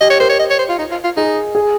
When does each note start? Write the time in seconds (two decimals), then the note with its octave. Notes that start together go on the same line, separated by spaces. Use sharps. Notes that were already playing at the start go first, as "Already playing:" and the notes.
0.01 G4 D#5
0.10 C#5
0.20 A#4 C5
0.29 C#5
0.39 D#5
0.50 C#5
0.59 C5
0.69 F4
0.79 D#4
0.91 F4
1.04 F4
1.17 D#4 G#4
1.55 G#4